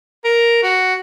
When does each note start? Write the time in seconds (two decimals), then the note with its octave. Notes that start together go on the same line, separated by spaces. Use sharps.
0.24 A#4
0.63 F#4